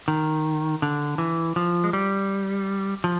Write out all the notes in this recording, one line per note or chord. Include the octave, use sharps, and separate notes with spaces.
D#3
D3
E3
F3
G#3
G3
F3